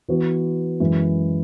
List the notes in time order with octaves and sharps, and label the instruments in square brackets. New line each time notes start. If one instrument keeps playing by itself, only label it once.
[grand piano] E3 B3 F#4
F#2 E3 G#3